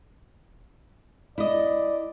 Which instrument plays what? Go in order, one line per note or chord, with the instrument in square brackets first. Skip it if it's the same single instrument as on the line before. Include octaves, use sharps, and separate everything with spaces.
[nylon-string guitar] E4 D#5 [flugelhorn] D5